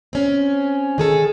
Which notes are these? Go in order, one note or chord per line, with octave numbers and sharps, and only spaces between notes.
C4 C#4
D#3 G#4 A4